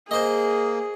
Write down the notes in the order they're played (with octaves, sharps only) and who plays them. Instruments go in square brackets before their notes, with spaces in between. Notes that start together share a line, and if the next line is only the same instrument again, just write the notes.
[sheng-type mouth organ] A#3 [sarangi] G#4 [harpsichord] C5 D#5